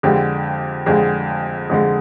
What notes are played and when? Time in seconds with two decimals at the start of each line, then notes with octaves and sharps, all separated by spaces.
0.03 F2 D3 G#3 G4
0.86 F2 D3 G#3 G#4
1.70 F2 D3 G#3